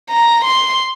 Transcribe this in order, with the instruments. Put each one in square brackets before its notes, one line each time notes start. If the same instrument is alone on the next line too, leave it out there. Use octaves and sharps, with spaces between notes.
[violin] A#5
C6